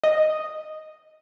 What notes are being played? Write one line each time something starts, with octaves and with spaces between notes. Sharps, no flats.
D#5